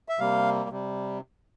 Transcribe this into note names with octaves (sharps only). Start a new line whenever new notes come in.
E5
C3 G3 A#3 F5
C3 G3